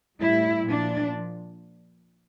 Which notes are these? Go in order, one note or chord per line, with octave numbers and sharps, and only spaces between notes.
A2 G3 E4
A#2 F3 D4